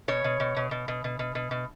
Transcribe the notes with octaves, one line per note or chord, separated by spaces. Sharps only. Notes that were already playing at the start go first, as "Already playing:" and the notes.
B2 C#5
B2
B2
B2
B2
B2
B2
B2
B2
B2